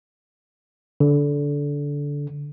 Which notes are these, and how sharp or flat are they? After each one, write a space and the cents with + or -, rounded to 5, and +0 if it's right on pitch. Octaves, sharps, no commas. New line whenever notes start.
D3 -20